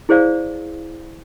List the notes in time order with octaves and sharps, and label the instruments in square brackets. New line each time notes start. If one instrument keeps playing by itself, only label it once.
[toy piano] E4 G#4 C5 D5 F5